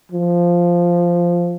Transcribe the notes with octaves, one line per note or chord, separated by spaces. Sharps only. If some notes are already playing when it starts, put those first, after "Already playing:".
F3